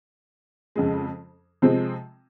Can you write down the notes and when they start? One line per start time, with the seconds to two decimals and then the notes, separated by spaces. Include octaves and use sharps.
0.76 F2 C#3 G#3
1.62 C3 F3 G#3 C4